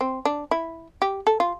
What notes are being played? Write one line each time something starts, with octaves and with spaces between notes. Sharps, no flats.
C4
D4
E4
G4
A4
F4